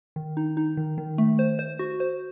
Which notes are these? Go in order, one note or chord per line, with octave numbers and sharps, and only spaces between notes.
D#3
D#4
D#4
D#3
D#3
A3
C5
C5
F#4
C5